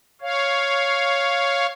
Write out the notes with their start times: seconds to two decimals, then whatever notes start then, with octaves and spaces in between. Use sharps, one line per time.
0.21 C#5 F5